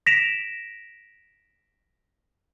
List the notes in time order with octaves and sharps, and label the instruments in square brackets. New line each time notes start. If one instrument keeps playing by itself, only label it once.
[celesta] A#6 B6 D7 E7 F7